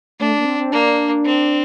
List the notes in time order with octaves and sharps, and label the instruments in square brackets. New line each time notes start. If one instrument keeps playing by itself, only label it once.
[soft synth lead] A3 [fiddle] D4
[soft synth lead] A#3
C4
C4
[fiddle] A#3 [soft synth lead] D4
[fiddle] C4